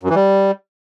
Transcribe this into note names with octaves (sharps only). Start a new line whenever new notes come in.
F#2
E3
G3